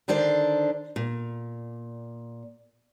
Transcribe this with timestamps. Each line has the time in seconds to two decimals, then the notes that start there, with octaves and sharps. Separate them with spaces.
0.08 D3 D#3 D4 C5 D5
0.96 A#2